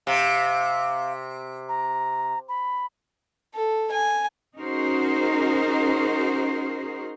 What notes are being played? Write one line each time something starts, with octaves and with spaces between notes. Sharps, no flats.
C3 F5
A#5
B5
A4
G#5
C#4 D#4 F#4 G#4 A#4 C5